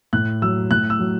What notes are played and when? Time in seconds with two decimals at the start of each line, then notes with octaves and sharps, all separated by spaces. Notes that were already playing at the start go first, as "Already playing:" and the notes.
0.13 A2 F#6
0.42 F#3 E6
0.71 A2 F#6
0.90 E6
0.99 F#3